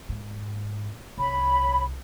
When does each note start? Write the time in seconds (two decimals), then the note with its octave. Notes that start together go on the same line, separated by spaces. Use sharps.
0.09 G#2
1.18 C2 C#5 B5